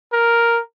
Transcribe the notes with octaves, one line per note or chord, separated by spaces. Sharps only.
A#4